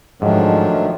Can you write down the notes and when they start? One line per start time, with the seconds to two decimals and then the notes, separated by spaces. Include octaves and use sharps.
0.22 G#2 D#3 F3 F#3 A3 D4